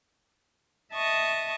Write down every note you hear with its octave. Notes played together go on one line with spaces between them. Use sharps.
D#5 E5 A5 C#6 D#6